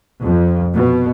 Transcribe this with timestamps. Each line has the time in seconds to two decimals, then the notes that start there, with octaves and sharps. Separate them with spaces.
0.24 F2
0.75 B2